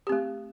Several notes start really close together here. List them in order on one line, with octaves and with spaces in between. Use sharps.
G4 C4 A3